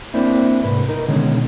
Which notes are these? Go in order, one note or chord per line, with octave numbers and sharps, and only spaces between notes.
A#3 C4 D4 E4
C2 G#2 B4
D#4 A#4
B2 D3 D#3 G#3 C#4